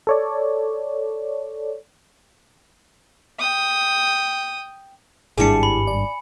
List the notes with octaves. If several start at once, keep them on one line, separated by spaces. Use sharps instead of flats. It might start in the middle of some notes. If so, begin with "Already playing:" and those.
A4 C#5 D5
G5 D#6
G#1 G2 G3 D4 E4 G#4 G#5 C#7
B5
D5